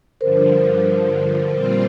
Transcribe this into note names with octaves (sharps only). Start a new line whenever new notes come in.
G2 D3 F3 A#4 C5
A#2 G3 C4 F4